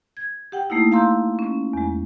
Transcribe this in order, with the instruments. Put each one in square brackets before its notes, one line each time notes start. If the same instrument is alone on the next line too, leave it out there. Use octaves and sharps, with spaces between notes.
[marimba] G#6
G4 F#5 G5
A3 A#3 D#4 E4
F5 A#5 C6 E6 G6
C#4
E2 G#3